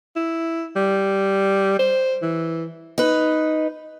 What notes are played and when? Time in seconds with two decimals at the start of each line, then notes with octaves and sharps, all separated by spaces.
0.16 E4
0.76 G3
1.79 C5
2.22 E3
2.98 D#4 B4